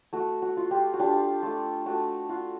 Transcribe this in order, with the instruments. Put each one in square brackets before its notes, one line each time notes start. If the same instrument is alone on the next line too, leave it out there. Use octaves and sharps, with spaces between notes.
[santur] A3 F#4
F#4
F4
F4 G4
F#4
D4 F4 G4
A3 F4
A3 F#4
F4 F#4